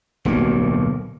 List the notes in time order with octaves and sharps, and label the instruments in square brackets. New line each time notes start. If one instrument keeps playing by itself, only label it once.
[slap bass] D1 B1 G2 A#3